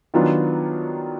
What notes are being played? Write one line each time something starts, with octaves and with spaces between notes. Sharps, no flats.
D#3 F#3 B3 D4 F4